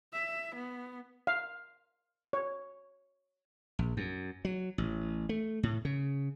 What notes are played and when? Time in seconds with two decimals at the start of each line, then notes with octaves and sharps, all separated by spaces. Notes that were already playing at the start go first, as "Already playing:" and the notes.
0.13 E5
0.55 B3
1.27 F5
2.33 C#5
3.79 A#1
3.97 F#2
4.45 F#3
4.78 A1
5.29 A3
5.63 A2
5.85 C#3